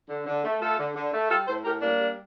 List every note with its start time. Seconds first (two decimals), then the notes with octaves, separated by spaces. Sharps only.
0.09 D3
0.26 D3
0.44 A3
0.61 A3 F4 A4
0.79 D3
0.95 D3
1.13 A3
1.30 G3 F4 A4
1.47 A2 A4 C5
1.65 A2 G4 A#4
1.81 G3 A#3 D4
1.99 G3